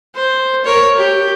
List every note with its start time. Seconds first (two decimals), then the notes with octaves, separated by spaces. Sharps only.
0.15 C5
0.65 A#4 C#5
0.97 G4